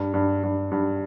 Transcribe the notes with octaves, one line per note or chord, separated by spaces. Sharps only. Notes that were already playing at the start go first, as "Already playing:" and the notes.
Already playing: G2
G2
G2
G2